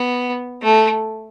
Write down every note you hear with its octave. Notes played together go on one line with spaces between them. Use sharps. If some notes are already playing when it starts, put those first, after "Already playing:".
Already playing: B3
A3